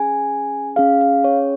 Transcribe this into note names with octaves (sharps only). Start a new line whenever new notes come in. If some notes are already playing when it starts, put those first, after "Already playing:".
Already playing: C#4 G#4 G#5
C#4 G#4 F5
F5
C#5